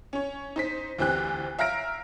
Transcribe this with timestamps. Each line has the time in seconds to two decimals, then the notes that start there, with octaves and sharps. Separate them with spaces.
0.13 C#4 C#5
0.56 D#4 C5 B6
0.98 D2 E3 C4 G4 F#6
1.59 E5 F5 A#5 F6 A#6 D7